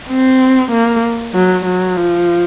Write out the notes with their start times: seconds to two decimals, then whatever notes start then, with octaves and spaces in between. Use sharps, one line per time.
0.10 C4
0.72 A#3
1.34 F#3
1.65 F#3
1.97 F3